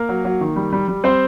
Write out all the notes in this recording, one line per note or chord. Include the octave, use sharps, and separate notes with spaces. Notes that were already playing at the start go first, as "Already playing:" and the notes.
Already playing: A#3 A#4
F#3
F#3
D#3
G3
G3
G3
G3 C4 C5